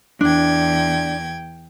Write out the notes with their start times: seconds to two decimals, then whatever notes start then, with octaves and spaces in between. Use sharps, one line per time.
0.21 E2 D4 G5 G#6